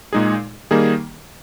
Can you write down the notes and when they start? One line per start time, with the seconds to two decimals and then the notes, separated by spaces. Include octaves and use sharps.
0.13 A#2 G#3 D#4 G#4
0.71 D#3 G3 A#3 D#4 G#4